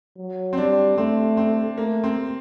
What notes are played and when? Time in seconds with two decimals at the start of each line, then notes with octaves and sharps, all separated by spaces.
0.17 F#3
0.53 C4
0.57 G3 D4
0.97 A3 C4
1.37 C4
1.77 A3 A#3
2.04 C4